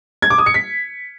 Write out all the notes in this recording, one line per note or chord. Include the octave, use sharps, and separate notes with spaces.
G#6
D6
D#6
C#7
B6